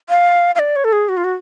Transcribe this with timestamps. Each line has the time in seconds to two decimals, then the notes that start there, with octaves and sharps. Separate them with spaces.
0.09 F5
0.55 F5
0.59 D5
0.76 C#5
0.84 A4
0.93 G#4
1.09 F#4
1.17 F4
1.24 F#4